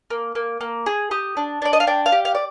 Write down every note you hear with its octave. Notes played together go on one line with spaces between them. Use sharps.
A#3
A#3
A#3
G#4
G4 D#6
D4
D4 D5
D#5
F5
D4 G5
F5
G4
F5
D5